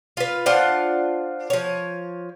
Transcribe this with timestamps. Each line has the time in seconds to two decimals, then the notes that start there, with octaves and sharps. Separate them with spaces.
0.17 F4 B4
0.46 D4 F4 C5 F#5
1.50 F3 C#5